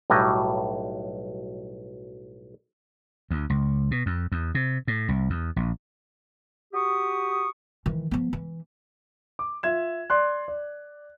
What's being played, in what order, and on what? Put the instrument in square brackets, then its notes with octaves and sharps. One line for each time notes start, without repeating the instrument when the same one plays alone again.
[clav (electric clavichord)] B1 A2 F#3 G3 D#5
[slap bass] D2
C#2
B2
F2
E2
C3
A2
C2
E2
A#1
[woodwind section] F#4 G4 C#6 D#6
[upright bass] D#3 E3
F3 B3
E3
[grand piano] D6
F4 E5 G#6 E7
D5 C6 F#6
D5